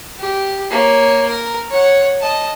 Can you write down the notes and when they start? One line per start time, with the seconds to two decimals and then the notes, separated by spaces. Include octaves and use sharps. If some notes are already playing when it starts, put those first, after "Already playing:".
0.19 G4
0.71 A#3 C#5
1.26 A#4
1.70 C#5 F#5
2.21 D#5 A5